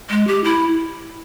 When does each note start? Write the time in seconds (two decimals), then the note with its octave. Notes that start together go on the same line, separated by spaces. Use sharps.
0.10 G#3
0.27 G4
0.44 E4